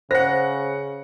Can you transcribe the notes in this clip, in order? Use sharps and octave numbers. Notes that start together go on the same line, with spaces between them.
C#3 C5 F#5 A#6